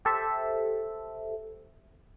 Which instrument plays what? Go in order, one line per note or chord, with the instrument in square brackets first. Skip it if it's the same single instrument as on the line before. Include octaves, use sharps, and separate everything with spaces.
[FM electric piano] G4 A4 C5 E5